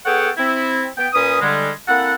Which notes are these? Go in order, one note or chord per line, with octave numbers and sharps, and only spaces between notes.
B3 G#4 A4 C#5 F#5 G5
C4 E4
B3 G5
A#2 C#4 B4 D#6
D3 G3 G#3
A#3 C4 E4 A4 F#5